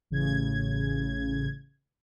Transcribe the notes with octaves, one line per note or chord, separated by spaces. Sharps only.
A1 C#3 G#6